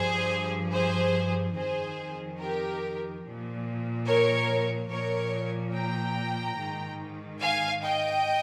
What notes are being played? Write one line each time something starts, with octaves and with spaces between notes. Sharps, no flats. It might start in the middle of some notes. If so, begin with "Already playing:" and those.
Already playing: G2 F3 G#4 C5
G#4 C5
F2 D#3 G#4 C5
G4 A#4
A#2 F3
A#4 C#5
A#2 F3 A#4 C#5
G5 A#5
G#2 D#3
F5 G#5
D#5 G5